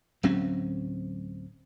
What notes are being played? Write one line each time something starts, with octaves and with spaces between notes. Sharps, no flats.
D1 F#3 C4 C#4